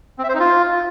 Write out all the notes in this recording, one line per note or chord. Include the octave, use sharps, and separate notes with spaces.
C4
E5
C5
D#4
F4